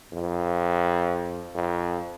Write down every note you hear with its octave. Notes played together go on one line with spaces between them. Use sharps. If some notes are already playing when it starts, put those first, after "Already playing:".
F2
F2